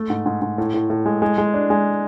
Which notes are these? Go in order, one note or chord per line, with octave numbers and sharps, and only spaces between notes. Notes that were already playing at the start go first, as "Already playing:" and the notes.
Already playing: A3
G#2
G#2
G#2
A2
A2
A2
G#3
G#3
G#3
D4
G#3